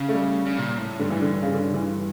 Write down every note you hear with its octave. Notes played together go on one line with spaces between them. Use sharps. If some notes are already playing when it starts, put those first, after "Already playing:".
Already playing: C#3
A3
G3
C#3
A#2
A2
G2 D3
E3
D3
C#3
D3
D3
E3